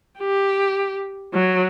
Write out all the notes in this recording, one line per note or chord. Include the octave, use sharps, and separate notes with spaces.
G4
F#3